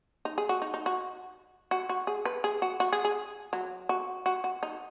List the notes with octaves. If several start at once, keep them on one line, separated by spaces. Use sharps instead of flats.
D#4
G#4
F#4
D#4
D#4
F#4
F#4
F#4
G#4
B4
G#4
F#4
F#4
G#4
G#4
F#3
F#4
F#4
F#4
D#4